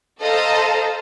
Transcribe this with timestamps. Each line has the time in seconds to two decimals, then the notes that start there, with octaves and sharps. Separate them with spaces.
0.21 A4 C5 D#5 F5 A5 A#5